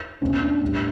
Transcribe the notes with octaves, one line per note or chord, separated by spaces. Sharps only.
B2 A3 C#4
D4
A2 G3